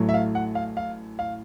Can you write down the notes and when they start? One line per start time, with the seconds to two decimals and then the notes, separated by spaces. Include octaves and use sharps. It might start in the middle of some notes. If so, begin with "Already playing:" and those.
Already playing: A1 A2 F#3 A3
0.09 E5
0.14 F5
0.35 F#5
0.55 F5
0.77 F5
1.19 F5